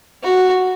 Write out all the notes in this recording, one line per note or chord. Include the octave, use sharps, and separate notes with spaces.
F#4